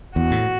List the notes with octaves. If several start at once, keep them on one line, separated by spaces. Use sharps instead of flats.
E2 F#4
A2